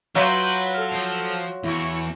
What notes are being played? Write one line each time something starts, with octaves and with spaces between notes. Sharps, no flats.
F#3 F4 B4 E5 G6 D7
A4 F6
F3 C5
E2 E4 C#6